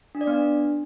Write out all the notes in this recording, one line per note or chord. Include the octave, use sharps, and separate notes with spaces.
D4
D5
B3
D4